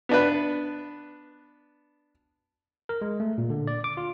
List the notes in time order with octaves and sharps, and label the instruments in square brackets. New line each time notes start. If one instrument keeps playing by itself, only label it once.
[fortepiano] B3 D4 B4
[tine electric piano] A#4
G#3
A3
A#2
D3
D5
D6
F4